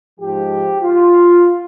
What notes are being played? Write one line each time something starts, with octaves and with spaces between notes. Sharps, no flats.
G#2 F3 G4
F4